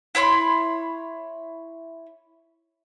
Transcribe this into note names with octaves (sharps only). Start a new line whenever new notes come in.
E4 C#5 B5 C6